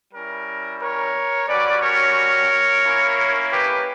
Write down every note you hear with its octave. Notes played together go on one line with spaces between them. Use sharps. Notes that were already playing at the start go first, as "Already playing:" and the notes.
G3 C#4 E4 A#4
A#4 C#5
G3 C#4 F#4 B4 D5
A#4 C#5
A#3 C#4 E4
G4 B4